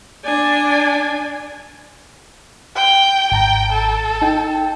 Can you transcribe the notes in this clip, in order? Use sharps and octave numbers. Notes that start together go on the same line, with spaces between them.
D4 G#5
G5
G#1 G5 A5 A#5
A4
D#4 G5